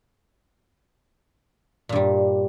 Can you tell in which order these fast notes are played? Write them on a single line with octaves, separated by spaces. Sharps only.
A#2 G2 G3